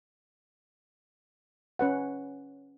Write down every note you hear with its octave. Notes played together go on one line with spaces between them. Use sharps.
C#4 B4 F#5